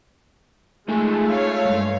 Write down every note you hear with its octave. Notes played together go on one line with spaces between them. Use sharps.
G#3 A3 D#4 F4 G#5
C#5 F5
G2 G#3